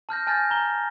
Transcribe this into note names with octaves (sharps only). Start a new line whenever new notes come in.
A5 F6 G6 A#6
G#5 A5 F6 G6 A6 A#6
A#5 G7